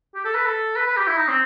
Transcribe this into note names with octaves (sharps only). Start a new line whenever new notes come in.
G4
A4
B4
A4
B4
B4
G4
E4
D#4
C4